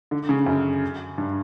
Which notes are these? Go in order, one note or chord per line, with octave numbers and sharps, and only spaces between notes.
D3
C#3
F#2
G2